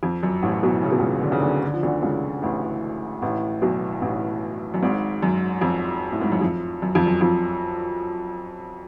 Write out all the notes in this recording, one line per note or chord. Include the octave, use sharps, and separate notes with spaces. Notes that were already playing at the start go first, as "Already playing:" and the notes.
F2
F#2
A1 A2
B1 B2
C#3
B2
C#2 C#3
D3
C#3
D2 D3
D3
F3
D2 D3
C#2 C#3
A1 A2
A1 A2
B1 B2
A1 A2
F#2
G#1 G#2
F#2
F2
A2
G#2
F#2
F2
F#2
F2
F#2
F2 F3